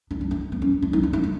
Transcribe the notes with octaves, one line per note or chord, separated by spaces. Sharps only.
D4
D4
D4
B3
C#4
D4
D#4
D4
D#4
D4